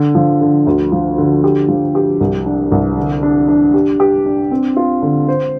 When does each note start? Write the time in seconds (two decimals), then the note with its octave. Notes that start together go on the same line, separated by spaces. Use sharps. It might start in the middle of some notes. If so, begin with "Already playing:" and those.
Already playing: D3
0.15 F3
0.41 D3
0.67 D2
0.92 F3
1.18 D3
1.44 G4
1.68 F3
1.95 G4
2.21 C2
2.46 D4
2.72 C2
2.97 D3
3.23 D4
3.48 D4
3.74 G4
4.00 G4
4.26 D4
4.51 C4
4.77 F4
5.02 D3
5.28 C5